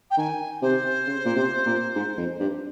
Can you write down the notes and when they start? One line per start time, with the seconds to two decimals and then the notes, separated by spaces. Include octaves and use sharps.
0.10 G5
0.18 D#3 G#5
0.62 C3 C5
1.07 C#3
1.25 A#2
1.36 C3
1.66 A#2
1.96 G#2
2.18 F2
2.40 G2